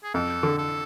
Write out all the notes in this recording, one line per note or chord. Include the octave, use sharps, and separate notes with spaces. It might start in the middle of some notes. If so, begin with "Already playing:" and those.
G#4
F2 A4
D3
A4